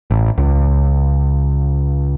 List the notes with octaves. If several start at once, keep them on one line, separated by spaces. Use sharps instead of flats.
A1
C#2